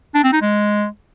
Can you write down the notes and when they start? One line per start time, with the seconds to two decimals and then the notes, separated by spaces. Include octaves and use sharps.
0.14 D4
0.23 C4
0.32 D#4
0.41 G#3